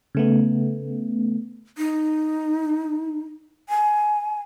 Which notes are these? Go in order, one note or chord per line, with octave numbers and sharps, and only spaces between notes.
C#3 A3 B3
D#4
G#5